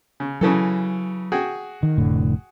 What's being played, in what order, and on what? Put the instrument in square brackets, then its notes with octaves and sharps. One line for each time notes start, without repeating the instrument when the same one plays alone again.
[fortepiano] C#3
[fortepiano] C#3 E3 A4 [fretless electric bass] F#3
[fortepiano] F#4 G#4 G5
[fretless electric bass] D#3
F1 A2 D3